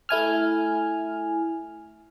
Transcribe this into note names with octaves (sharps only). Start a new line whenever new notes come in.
A3 E4 G#5 F6